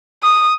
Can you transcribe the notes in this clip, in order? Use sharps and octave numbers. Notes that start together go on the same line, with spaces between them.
D#6